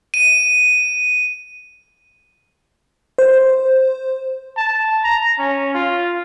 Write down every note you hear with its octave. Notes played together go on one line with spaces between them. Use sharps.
D#7
C5
A5
A#5
C#4
F4